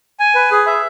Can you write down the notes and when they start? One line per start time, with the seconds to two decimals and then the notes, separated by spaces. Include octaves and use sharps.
0.20 G#5
0.35 B4
0.51 G#4
0.67 E5